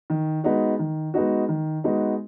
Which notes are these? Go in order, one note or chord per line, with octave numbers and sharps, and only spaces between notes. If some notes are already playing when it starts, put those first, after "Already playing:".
D#3
G#3 B3 D#4 F#4
D#3
G#3 B3 D#4 F#4
D#3
G#3 B3 D#4 F#4